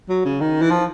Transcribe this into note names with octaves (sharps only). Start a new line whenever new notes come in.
F#3
C#3
D#3
E3
F3